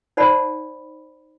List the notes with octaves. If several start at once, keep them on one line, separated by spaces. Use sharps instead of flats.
D#4 C5 D5 F#5 A5 B5